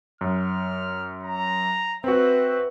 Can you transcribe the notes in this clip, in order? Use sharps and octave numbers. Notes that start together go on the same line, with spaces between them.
F#2 F6
A#5
C4 F#4 B4 E5